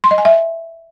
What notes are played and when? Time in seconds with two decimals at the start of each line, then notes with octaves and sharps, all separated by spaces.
0.04 C6
0.11 D#5
0.18 G#5
0.25 E5